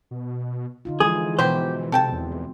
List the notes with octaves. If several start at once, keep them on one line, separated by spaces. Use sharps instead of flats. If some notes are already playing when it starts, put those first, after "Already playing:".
B2
D3 D#4 F4
E3 F3 G#3 G#4
B2 F#3 B3 G4 C5
C3 C4 A4 G5 A5
E2